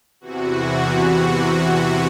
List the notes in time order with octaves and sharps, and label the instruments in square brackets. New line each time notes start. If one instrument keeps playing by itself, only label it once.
[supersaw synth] E2 C3 E3 F#4